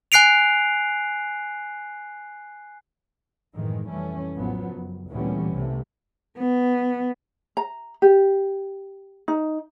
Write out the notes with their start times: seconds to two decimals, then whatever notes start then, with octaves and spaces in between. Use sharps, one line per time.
0.12 G#5 F#6 C7 D7 F7
3.55 F#2 A2 D#3 E3 G#3
3.87 F1 E3 G3 A3 C#4
4.36 A1 F3 F#3 B3
4.66 F#1
5.09 D2 A#2 E3 G3 B3 C#4
5.53 C2 C3 E3 A3
6.40 B3
7.57 A#5
8.02 G4
9.28 D#4